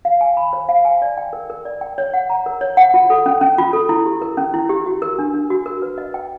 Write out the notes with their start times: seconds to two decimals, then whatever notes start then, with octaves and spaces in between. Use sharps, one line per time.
0.05 F5
0.21 G#5
0.37 B5
0.53 C5
0.69 F5
0.85 G#5
1.02 D5
1.17 G5
1.33 A#4
1.50 A#4
1.65 D5
1.81 G5
1.98 C#5
2.14 F#5
2.30 A#5
2.46 A#4
2.61 C#5
2.77 F#5
2.94 F4
3.10 A4
3.26 C#4
3.41 C#4
3.58 F4
3.73 A4
3.89 E4
4.06 G4
4.22 A#4
4.37 C#4
4.54 E4
4.69 G4
4.86 F#4
5.02 A#4
5.19 D4
5.34 D4
5.50 F#4
5.66 A#4
5.82 B4
5.98 D#5
6.14 G5